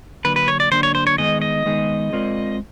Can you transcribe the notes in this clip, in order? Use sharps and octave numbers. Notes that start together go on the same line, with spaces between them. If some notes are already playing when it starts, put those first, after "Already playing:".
D3 F#3 A#3 D4 B4
B4
C#5
D5
D3 F#3 A#3 D4 C5
C#5
C5
C#5
D#3 G#3 B3 D#4 G#4 D#5
D#5
D#3 G#3 B3 D#4 G#4
G#3 C4 F4 A#4 D5